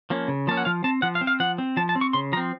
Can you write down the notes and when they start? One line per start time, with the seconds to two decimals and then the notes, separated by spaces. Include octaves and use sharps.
0.10 F3 A#3 C#4
0.28 C#3
0.47 F3 A#3 C#4 A5
0.57 F#5
0.65 F3 F5
0.84 C4 A5
1.02 F3 F#5
1.15 F5
1.21 C4
1.27 F5
1.40 F3 F#5
1.58 C4
1.77 F3 A5
1.89 A5
1.95 C4
2.01 C#6
2.13 C#3 C6
2.33 F3 A#5
2.37 C4